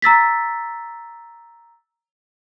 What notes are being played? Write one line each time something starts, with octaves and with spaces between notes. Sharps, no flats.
A#5 E6 A6 B6